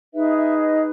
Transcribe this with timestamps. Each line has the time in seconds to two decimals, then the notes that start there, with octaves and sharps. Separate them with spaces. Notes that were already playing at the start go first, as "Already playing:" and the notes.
0.13 D#4 G#4 B4 E5
0.36 E5
0.58 D#5